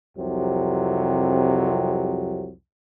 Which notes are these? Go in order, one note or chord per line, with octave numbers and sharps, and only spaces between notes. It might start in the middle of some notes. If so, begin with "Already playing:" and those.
C2 F2 C3 F#3